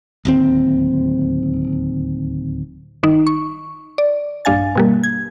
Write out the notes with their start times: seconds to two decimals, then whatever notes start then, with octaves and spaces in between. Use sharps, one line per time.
0.25 D1 D#2 C4
3.03 G1 D#3 D#4
3.27 C#6
3.98 D5
4.45 A#1 G2 D4 F5 G#5 A6
4.75 B2 G3 A#3
5.04 G#6